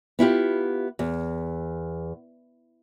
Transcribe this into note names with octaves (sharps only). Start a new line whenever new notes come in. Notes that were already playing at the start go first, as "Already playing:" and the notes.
B3 E4 F4 G4
E2